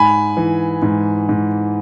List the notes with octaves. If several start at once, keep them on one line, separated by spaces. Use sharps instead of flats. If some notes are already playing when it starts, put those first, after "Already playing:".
Already playing: G#2 G#5 B5
E3
G#2
G#2